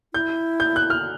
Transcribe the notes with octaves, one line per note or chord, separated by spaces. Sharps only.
E4 G6
G6
F#6
F6